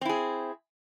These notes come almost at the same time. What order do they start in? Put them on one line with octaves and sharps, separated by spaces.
C4 E4 G#4